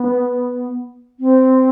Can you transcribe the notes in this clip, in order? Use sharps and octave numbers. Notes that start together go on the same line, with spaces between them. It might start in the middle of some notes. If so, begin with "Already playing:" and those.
Already playing: B3
C4